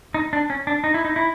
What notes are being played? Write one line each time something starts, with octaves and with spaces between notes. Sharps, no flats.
D#4
D4
C#4
D4
D#4
E4
D#4
E4